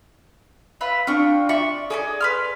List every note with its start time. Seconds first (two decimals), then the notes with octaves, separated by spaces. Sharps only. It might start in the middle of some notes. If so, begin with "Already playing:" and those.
0.81 F4 B4 E5
1.07 C4 D4 F4 C#6
1.49 F4 D5 E5 C#6
1.90 G#4 A4 D5 D#5
2.21 B4 C6 F6